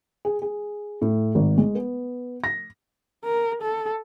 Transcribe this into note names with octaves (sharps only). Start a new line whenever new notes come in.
G#4
G#4
A2
G#1
G#3
B3
A#6
A#4
A4